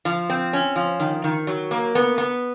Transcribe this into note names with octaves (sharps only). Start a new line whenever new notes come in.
F3
C4
C#4
F3
D#3
D#3
F#3
A#3
B3
B3